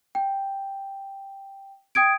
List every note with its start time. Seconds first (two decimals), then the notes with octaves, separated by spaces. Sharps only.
0.15 G5
1.95 G5 D#6 G#6 D7